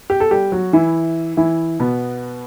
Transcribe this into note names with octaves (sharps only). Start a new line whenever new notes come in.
G4
A4
G3 G4
F#3 F#4
E3 E4
E3 E4
B2 B3